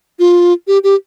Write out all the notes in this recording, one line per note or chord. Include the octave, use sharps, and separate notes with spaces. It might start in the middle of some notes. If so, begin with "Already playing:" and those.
F4
G4
G4